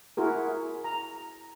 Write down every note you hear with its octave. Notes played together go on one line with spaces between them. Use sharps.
E4 F#4 G#4 A#4
A#5